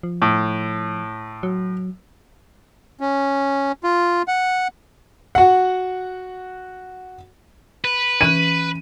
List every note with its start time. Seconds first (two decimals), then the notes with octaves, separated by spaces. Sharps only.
0.03 F3
0.22 A2
1.43 F#3
3.00 C#4
3.84 F4
4.28 F#5
5.35 F#4 F#5
7.85 B4
8.21 E3 C#4 F#6 D#7